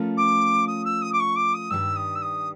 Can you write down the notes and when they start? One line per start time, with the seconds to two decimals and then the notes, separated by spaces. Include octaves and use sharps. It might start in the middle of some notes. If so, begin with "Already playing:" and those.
Already playing: F3 A3 C#4 F4 A#4
0.17 D6
0.67 D#6
0.85 E6
1.02 D#6
1.13 D6
1.20 C#6
1.36 D6
1.54 D#6
1.70 G2 D#3 G3 E6
1.96 D#6
2.15 E6
2.22 D#6